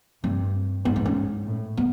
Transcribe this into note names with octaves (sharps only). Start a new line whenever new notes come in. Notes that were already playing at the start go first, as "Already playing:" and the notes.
G2 C4
G#2 B3
C4
C#4
A2
B3